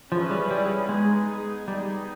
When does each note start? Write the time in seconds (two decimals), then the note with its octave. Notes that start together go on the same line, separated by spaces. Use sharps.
0.11 F3 C#4 E4 G#4 B4
0.31 G3
0.51 G3
0.89 G#3 B3 D#4 G#4
1.68 G3 B3 D#4 G#4